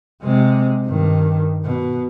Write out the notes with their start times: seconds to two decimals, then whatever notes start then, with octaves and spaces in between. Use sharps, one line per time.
0.22 C3 G#3
0.85 G2 D#3
1.64 B2